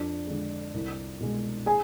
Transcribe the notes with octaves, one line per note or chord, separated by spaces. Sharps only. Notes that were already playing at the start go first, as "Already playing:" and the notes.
Already playing: F2 D4 D5
D3 G#3
C2
B2 G#3
G#4 G#5